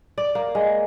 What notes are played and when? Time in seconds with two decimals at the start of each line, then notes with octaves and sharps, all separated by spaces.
0.18 D5
0.35 A#3
0.55 G#3